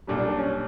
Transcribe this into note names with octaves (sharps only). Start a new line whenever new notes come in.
B1 A#2 G3 D4
D4
D4
C#4